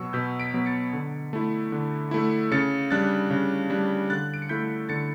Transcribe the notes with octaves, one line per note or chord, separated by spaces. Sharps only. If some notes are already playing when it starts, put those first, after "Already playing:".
Already playing: B2 F#3 B3 C#6 E6
B2 G6 B6
B6 D7
F#3 B3 B6
A6 C#7
D3
A3 E4
D3
A3 E4
C#3 A6 C#7
G3 D4 F#6 A6
C#3
G3 D4
D3 F#6 A6
D7
C#7
A3 E4 G6 B6
D3 A6 C#7